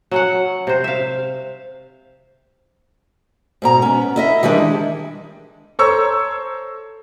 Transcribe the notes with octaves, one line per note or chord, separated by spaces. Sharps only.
F#3 C#4 F#5
C3 C5
E5 F5
G#2 B2 A#5
B3 C#4
E4 D#5 E5
D#3 E3 G3 G#3 D4 E4
A4 C5 C#5 A#5 C#6 E6